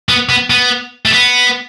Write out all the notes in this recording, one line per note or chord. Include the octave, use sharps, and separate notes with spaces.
B3
B3
B3
A3
B3